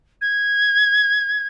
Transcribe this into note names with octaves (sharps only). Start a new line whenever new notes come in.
G#6